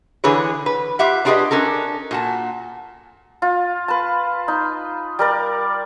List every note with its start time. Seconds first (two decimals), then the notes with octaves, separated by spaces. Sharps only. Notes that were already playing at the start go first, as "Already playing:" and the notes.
0.24 D3 E3 G#4 B4 C#5
0.66 B4
0.99 F4 G4 E5 F#5
1.25 D4 F4 G4 G#4 B4 D#5
1.51 C#4 D4 A4 A#4
2.11 A#2 F#4 A5
3.42 F4
3.88 B4 A5
4.48 D#4
5.19 G3 A#4 D5